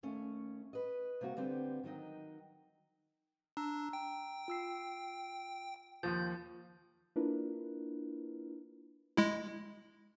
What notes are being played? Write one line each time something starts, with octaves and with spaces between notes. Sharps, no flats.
D#2 A3 C#4
B4 D#5
C3 A#3 F#4
D3 B3 C4 G4
D#3 F#3 D#4 D#5 G5
D4 A#5 E6
G5
F4 E6 C7
D#2 F3 G6
A#3 D4 E4 F4 A#4 B4
G#3 E4